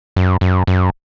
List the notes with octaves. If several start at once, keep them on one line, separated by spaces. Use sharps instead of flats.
F#2
F#2
F#2